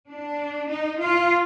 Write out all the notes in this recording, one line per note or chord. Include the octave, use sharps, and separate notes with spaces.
D4
D#4
F4